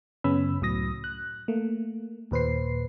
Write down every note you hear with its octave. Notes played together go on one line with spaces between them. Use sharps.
F#2 C#3 B3 C#4 B5 E6
C#2 A2 F#3 D#6 A#6
F#6
A3 A#3
D#2 A#2 B4 C5 C7